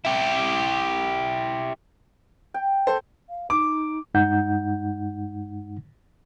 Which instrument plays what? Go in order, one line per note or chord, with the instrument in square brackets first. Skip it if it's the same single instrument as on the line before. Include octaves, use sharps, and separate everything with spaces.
[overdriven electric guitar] E4 G4
[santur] G5
[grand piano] A4 C5
[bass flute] F5
[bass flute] D#4 [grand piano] D6
[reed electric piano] G2 G#3 D#4 F#5 G6